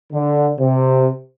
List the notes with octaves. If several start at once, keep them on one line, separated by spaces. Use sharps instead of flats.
D3
C3